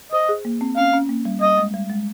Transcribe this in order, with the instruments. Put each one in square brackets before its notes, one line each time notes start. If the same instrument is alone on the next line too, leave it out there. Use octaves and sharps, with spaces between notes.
[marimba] C5 [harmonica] D#5
[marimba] G#4
A#3
C4
[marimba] C#4 [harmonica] F5
[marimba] C#4
A#3
G3
[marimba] G3 [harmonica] D#5
[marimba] G#3
G3
G#3